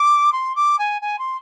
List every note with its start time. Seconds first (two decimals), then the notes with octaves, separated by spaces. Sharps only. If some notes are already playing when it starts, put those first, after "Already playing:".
Already playing: D6
0.32 C6
0.56 D6
0.79 G#5
1.01 G#5
1.19 C6